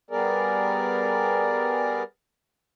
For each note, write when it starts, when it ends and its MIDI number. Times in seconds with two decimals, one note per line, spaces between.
0.11 2.03 55
0.11 2.03 59
0.11 2.03 68
0.11 2.03 70
0.11 2.03 74